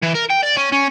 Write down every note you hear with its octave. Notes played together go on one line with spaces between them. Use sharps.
E3
A#4
G5
D5
C#4
C#4